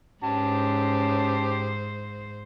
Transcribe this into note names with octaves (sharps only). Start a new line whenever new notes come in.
G#2 C#4 G4 C5 A5